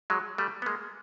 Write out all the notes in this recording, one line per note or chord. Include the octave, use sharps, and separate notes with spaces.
F#3 G#3
G3 A3
B3
G#3 A#3